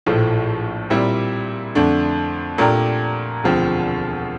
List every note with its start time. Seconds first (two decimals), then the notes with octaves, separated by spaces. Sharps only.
0.06 A#1 A2 F3 A3
0.90 A#2 G3 C4 E4
1.75 F2 D3 A3 D4
2.58 A#2 A3 D4 G4 A#4
3.44 E1 D2 D3 F3 C4